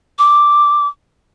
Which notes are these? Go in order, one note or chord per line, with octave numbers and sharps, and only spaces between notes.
D6